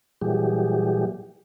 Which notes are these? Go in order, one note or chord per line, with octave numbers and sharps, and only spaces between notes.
A#2 E3 F#3 G3 G4 G#4